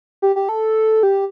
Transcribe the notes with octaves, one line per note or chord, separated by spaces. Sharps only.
G4
G4
A4
G4